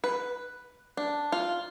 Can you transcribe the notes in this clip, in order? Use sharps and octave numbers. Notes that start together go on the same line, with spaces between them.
B4
D4
F4